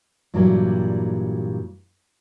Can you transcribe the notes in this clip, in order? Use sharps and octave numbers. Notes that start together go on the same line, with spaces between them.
G2 A#2 E3 F#3 G3 A#3